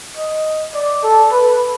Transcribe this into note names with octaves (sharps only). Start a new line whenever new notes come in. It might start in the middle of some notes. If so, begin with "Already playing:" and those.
D#5
D5
A4
B4